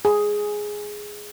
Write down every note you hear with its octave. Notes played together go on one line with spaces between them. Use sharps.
G#4